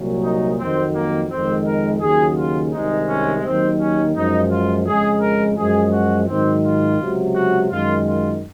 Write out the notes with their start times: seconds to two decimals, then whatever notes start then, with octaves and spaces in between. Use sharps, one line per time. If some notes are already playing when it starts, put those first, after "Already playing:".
Already playing: C2 A#2 F#3
0.23 D#4
0.58 F2 D#3 F#3 C4
0.94 A#3
1.30 F2 D#3 G#3 C4
1.66 A#4
2.01 D#2 C#3 F#3 G#4
2.37 F4
2.73 C2 C3 D#3 G#3 D#4
3.08 C#4
3.43 D#2 D#3 F#3 C4
3.79 C#4
4.14 F#2 F3 G#3 D#4
4.50 F4
4.86 F2 C#3 G#3 G#4
5.21 A#4
5.57 F#2 F3 G#3 G#4
5.92 F#4
6.27 G#2 D#3 F#3 C4
6.64 F4
6.99 C#2 C3 F#3
7.34 F#4
7.70 F#2 D#3 G#3 F4
8.06 F4